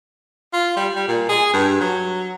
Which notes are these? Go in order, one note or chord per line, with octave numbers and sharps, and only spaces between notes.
F4
G3
G3
A#2
G#4
G2
F#3